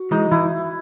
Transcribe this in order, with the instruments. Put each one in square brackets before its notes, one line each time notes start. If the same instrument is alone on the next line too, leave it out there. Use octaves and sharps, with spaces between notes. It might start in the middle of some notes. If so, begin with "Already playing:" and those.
Already playing: [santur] F#4
[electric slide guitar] E3 G#3 [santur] D#4
[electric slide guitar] E3 [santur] E4